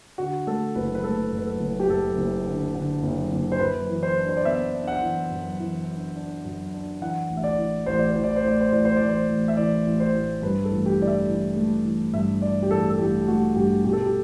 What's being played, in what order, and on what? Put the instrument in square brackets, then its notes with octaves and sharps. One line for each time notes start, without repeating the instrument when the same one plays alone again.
[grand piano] D3 F#4
A3 A4
F#1 B4
B4
A3 A4
F#2
B4
A4
F#1
G4
F#2 A4
F#1
D3
D3
F#1
F#1
C5
F#2 B4
E3
C5
D4
C5
D5
B3 E5
D4
F#5
E3
F#2
E3
D4
D4
F#2
D4
E3 F#5
A1
E5
D5
E3
A1 C5
D5
E3 C5
D5
C5
A2 D5
C5
A1 D5
C5
A1 D5
C5
A1
E5
E3 D5
A1
C5
A2
G2 B4
A4
A1
G4
E3 D5
E5
E3
A3
E3
G2 E5
E3 D5
G4
A1 A4
A4
A1 G4
A3 F#4
G2 G4
B2 G4
A4
G4